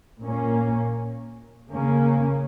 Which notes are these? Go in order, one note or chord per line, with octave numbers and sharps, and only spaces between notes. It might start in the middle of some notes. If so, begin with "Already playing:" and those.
A#2 A#3 C#4
C#3 A#3 C#4